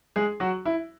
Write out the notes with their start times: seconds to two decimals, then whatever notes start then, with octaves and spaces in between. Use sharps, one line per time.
0.16 G#3 G#4
0.40 F#3 F#4
0.65 E4